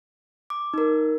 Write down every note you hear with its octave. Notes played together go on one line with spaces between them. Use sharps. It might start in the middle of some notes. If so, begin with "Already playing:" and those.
D6
D#4 A#4